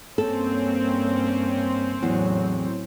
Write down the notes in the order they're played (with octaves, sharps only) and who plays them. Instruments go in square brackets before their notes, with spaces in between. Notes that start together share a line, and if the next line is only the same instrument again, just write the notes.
[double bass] G2 A#3 [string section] C4 C#4 [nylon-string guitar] A4
[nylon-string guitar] E2 [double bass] A2 F#3